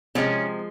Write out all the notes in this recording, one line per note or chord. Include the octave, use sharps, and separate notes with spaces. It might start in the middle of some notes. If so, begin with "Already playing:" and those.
C3 F3 G#3 C#4